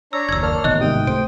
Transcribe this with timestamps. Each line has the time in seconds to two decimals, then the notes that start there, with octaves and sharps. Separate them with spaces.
0.13 D4 C#5 A#5 E6
0.29 F#1 D#2 E6 G#6
0.43 A#3 A#4 C#5 D5 A5 F6
0.64 A1 B2 D#3 D#5 F#6
0.81 G#2 C3 G5 D#6
1.07 C2 A3 C5 D7